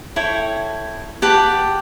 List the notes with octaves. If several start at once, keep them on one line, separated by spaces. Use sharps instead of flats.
E4 A4 C#5 G5
G4 B4 F#5 A5